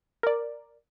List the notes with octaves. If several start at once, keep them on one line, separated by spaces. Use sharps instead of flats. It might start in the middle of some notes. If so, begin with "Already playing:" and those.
A#4 D5